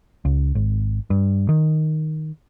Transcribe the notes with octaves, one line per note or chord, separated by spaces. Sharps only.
C#2
G#1
G2
D#3